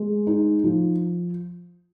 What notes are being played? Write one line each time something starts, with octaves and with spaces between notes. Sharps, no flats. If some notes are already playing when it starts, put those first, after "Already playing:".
Already playing: G#3
D#4
F3